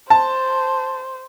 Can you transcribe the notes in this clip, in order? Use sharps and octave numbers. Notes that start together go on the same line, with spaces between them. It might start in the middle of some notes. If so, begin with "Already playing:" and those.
C5 A5